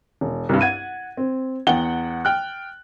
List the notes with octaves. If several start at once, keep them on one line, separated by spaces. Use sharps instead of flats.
E1
C2 G2
F#5 G#6 D#7
C4
E2 F#5 G5 G7
G5 F6 F#6